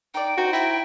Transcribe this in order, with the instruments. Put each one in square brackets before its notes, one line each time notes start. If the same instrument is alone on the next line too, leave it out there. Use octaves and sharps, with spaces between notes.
[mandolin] D#4 D5 [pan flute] G5
[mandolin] D#4 C5 [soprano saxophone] F#4
[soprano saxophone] E4 [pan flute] G5